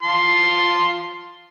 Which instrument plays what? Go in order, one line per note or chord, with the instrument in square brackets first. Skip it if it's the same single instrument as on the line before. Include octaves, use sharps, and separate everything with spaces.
[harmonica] F4 A5 C6